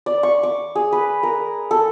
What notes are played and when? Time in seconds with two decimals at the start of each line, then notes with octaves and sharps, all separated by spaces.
0.06 D5
0.23 C#6
0.43 D6
0.75 G#4
0.92 B4
1.23 A#4
1.71 A4